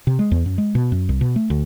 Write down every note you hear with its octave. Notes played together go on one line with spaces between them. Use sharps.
C3
G#3
E2
F#2
G#3
B2
F#2
C2
B2
A3
D2